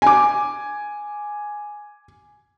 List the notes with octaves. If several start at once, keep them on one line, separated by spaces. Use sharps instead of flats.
G#5 D6